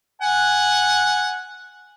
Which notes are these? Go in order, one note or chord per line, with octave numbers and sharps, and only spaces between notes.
F#5 G#5